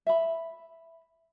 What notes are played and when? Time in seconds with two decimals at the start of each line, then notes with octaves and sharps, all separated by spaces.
0.07 E5 B5